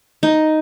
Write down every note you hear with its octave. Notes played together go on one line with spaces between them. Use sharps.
D#4